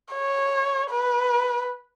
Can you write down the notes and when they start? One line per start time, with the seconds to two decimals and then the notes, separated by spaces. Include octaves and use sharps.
0.13 C#5
0.91 B4